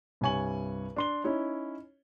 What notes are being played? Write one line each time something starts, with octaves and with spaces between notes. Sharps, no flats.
C2 G2 C#5 G#5 C#6 F#7
D4 C6 G7
C#4 D#4 E4 C#5